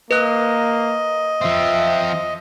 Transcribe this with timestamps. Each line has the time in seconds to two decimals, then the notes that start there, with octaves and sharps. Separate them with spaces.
0.11 A#3 B4 D#5 F#6
1.41 F3 C4 E5